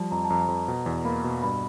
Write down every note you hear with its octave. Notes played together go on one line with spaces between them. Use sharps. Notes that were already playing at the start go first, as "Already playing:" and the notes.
Already playing: F3 G3 A5
F2 A#5
A5
F2 A#5
F2
B2
E2
A#3 B5
B2
G2 B5